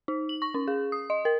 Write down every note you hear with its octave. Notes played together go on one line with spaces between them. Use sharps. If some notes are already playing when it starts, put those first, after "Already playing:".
D#4
F#7
C#6
C#4
G#4
D#6
D#5
A#4